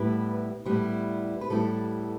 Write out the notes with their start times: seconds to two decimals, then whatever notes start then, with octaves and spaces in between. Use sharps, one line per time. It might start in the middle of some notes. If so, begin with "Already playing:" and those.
Already playing: A2 G3 B3 E4 B4
0.65 A2 G3 B3 E4
1.41 B4
1.50 A2 G3 B3 E4 A4